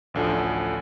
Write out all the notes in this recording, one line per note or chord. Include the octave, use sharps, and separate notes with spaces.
A1 D2 D3 F3